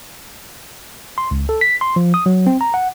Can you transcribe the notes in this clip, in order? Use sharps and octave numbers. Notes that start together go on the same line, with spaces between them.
C6
C#2
A4
B6
C6
F3
D#6
F#3
C4
A#5
F#5